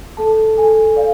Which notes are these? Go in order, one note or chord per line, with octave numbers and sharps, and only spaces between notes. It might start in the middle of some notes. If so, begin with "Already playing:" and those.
A4 A5
A4 G#5
D5 F5